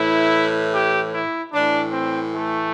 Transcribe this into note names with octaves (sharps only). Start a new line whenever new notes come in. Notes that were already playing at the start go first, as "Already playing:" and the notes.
Already playing: A2 E3 E4
G4
E4
A2 E3 D4
C4
A3